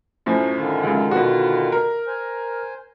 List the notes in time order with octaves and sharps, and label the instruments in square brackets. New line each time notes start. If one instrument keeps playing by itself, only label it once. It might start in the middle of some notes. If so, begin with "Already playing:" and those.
[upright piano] F#2 A2 F3
[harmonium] D3 D#3 F4
[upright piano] C#2 F#2
B2 F#4
A#4
[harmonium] C5 G#5